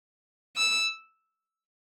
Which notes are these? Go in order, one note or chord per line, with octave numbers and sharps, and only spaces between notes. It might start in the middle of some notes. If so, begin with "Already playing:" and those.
E6